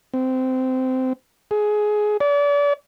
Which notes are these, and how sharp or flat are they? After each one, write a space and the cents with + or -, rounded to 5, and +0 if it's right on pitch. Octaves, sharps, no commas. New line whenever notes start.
C4 -20
G#4 +15
D5 -35